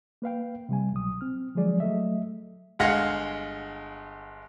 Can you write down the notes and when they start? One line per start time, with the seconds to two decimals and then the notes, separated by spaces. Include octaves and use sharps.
0.22 A#3 B4 F5 G5
0.69 C3 G3 G#5
0.92 C2 B2 F#3 D#6
1.21 C4 F6
1.55 D3 F3 F#3 G#3 G#4 D5
1.80 F#3 A3 A4 D#5 E5
2.79 G1 G#3 F5 F#5 A#6 C#7